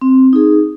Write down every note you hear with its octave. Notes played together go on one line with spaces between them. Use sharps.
C4
D#4 G#4